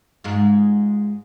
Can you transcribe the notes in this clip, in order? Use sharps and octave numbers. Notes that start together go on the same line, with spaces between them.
G#2 G#3 F4